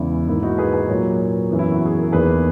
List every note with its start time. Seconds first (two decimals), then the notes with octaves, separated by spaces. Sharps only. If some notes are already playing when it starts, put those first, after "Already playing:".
Already playing: E2 C#3 E3 G#3 E4
0.28 G#2 D#3 A#3 E4
0.43 D#4 F#4
0.58 G#4 B4
0.73 G#4 B4
0.89 A#2 F#3 A#3 A#4 C#5
1.51 F#2 E3 B3
1.59 E4
1.72 F#4
1.85 G#4
1.99 A#4
2.12 E2 D#3 A#3 G#4 B4